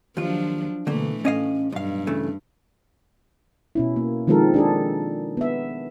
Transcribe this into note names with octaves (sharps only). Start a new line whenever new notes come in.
D#2 F3 F#3 D4 F4
B2 D3 E3 A3 A#3
A2 C#4 D#5 F5
B1 G2 F5
C#3 E3 A3
B2 C#4 E4
A#3
D#3 F3 G#3 C4 A4 A#4
D4 G#4 A4
B3 E5